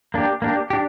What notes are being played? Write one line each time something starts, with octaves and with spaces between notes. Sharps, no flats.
A#3 D4 G4
A#3 D4 G4
D4 G4